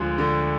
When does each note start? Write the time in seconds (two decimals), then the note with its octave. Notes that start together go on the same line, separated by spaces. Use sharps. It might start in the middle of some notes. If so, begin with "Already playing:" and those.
Already playing: D2 F3 G#3
0.18 D3